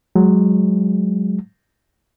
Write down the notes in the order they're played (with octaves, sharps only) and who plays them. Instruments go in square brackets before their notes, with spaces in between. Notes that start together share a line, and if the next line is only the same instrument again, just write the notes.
[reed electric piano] F#3 G#3